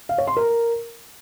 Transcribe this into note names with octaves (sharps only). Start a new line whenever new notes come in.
F5
C#5
C6
A#4